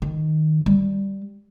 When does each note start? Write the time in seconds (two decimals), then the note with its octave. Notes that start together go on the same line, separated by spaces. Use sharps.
0.02 D#3
0.66 G3